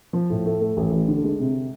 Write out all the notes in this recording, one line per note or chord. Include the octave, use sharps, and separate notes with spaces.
F3
A2
A3
A3
A1
A1
D3
G#3
C3